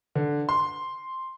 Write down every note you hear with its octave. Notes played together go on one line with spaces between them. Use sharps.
D3
C6